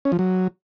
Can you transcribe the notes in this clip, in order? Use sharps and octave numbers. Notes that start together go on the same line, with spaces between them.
C#4
F3
F#3